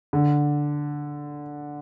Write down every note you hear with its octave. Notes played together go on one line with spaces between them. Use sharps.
D3